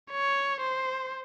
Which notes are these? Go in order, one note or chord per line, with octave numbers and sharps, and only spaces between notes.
C#5
C5